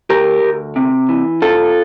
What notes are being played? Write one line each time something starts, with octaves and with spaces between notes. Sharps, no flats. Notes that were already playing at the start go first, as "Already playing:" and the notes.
D2 G4 A#4
D2
C3
E3
C2 F4 A4